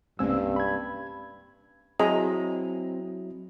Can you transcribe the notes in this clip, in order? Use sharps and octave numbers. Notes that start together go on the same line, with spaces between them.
C2 G2 G#3 A#3 C4 C#4 E6
B5 G#6
F#3 C4 E4 G#4 D#5 A#5